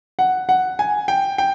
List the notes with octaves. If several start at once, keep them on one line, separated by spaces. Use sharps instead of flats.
F#5
F#5
G#5
G5
G5